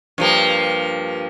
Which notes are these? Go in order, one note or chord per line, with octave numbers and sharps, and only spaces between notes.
G2 F3 A#3